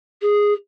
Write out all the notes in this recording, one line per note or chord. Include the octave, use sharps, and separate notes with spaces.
G#4